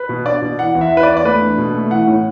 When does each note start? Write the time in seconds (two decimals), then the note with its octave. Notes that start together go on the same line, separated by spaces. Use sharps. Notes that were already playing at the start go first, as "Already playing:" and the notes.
Already playing: B4
0.09 B2
0.25 D4 D5
0.42 B2
0.59 E3 F#5
0.75 E2
0.81 E5
0.91 E3
0.97 B4
1.03 D5
1.09 E2
1.17 D5
1.24 A3 B4
1.41 D4
1.58 B2
1.74 A3
1.91 E3 F#5
2.07 A2